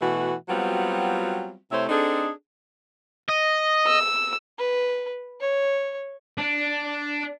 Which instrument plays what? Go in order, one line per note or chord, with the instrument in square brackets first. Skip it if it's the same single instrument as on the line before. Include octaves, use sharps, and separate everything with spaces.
[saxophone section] B2 E3 A3 F#4
F#3 G3 B3 C4 F4 F#4
C3 A3 E4 C5 C#5 E5
C4 D4 D#4 G#4 A4
[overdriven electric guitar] D#5
[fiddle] E6
[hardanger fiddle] B4
C#5
[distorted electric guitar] D4